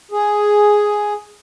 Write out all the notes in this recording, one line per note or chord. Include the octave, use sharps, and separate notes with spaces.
G#4